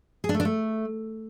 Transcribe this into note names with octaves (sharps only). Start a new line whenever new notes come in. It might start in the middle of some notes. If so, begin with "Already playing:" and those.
G#4
D4
A3
D4
A3